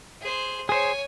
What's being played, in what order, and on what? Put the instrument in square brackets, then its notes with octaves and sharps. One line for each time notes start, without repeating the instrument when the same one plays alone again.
[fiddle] G#4 C5
[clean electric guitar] G#4 C5 [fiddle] C#5 G#5